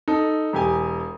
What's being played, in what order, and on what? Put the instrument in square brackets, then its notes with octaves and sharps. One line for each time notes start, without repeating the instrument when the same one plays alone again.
[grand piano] D#4 A4
E1 G4 G#5